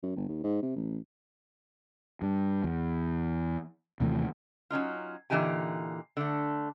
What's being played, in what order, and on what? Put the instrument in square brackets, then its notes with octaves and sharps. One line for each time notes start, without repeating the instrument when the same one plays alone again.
[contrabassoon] F#2
G1
D#2
G#2
C3
A1
[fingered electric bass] G2
E2
D#2 C3 E3 A3
[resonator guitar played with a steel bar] F#3 C#4 D#4 F4
A#2 D3 E3 D#4 G4 G#5
D3 A3